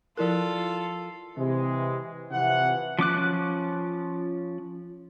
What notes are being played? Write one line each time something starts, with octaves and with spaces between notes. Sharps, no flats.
F3 E4 F4 A4 A#4
C3 E3 G#3
C3 E3 F3 F#5
F3 C#4 D6 F#6